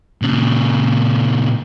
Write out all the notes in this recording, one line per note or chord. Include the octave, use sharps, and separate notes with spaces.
A#2 C#3